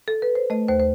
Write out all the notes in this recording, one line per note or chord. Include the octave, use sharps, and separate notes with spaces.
A4
B4
C5
A3 D#5
D#2 C5
C5